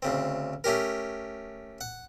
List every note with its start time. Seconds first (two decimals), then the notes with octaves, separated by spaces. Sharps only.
0.02 D2 C#3 C4
0.64 A3 C#4 G4 A#4
1.81 F#5